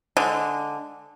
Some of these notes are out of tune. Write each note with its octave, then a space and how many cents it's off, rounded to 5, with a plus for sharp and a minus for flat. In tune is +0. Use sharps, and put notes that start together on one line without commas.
D3 +0 G#3 +5